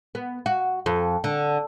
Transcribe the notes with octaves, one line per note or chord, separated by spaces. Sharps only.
B3
F#4
F2
D3